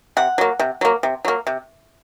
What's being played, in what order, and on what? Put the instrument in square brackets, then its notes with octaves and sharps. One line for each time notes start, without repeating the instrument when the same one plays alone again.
[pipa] C3 F#5
F#3 A#3
C3
F#3 A#3
C3
F#3 A#3
C3